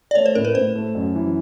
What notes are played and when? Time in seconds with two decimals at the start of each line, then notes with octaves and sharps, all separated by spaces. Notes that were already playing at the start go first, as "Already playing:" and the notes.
0.11 D5
0.15 A3 C#5
0.26 C5
0.35 A2 A#4
0.45 B4
0.55 A2 C5
0.75 A3
0.95 F#2
1.15 E3